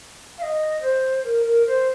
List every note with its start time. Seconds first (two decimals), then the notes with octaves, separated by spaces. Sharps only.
0.38 F5
0.42 D#5
0.81 C5
1.24 A#4
1.45 A#4
1.67 C5